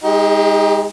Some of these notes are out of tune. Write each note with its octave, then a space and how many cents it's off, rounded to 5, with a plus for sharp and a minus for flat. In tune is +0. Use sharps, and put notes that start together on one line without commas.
G#3 -20 D#4 +25 G4 +25